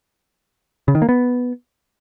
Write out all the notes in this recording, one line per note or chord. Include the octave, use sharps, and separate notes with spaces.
C#3
D#3
A#3
B3